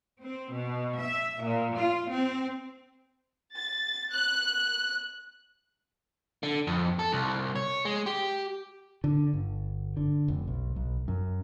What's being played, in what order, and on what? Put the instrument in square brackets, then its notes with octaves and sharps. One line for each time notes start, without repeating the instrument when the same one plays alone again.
[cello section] C4
B2
E5
A#2
F4
C4
[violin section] A6
F#6
[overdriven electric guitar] D3
F2
A4
C2
C#5
G#3
G4
[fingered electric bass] D3
G1
D3
F1
B1
B1
F#2